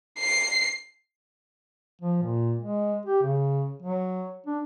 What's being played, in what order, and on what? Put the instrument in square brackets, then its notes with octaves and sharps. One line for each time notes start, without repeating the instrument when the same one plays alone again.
[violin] C7
[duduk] F3
A#2
G#3
G4
C#3
F#3
D4